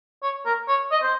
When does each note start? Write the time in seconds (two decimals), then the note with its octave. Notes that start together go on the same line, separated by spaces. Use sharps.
0.23 C#5
0.46 A#4
0.68 C#5
0.91 D#5
1.03 C5